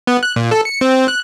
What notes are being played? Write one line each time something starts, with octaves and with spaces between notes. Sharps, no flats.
B3
F#6
A#2
A4
C#7
C4
F#6